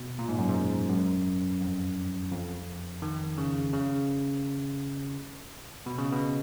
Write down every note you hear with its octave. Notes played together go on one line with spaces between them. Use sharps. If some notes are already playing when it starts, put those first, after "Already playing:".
Already playing: B2
A#2
G#2
F#2
G#2
F#2
F2
F2
D#3
C#3
C#3
B2
C#3
B2